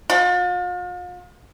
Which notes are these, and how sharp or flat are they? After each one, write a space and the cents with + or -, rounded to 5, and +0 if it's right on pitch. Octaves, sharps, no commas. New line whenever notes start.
F4 +40